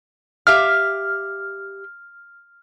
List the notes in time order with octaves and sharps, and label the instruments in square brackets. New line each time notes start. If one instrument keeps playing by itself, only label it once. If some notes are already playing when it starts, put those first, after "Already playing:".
[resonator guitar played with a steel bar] G4 E5 F5 [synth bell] F6